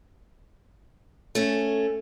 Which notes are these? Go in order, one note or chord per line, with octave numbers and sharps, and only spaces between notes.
A3 C#4